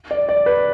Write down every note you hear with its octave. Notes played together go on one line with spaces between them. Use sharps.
D5
D5
B4